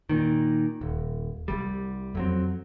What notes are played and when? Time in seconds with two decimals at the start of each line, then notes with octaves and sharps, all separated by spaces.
0.09 A#2 D#3
0.81 D#1
1.48 C2 G3
2.15 F2 F#3 C4